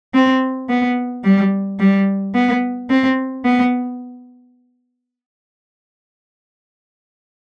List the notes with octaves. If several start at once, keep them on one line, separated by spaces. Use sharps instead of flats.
C4
B3
G3
G3
B3
C4
B3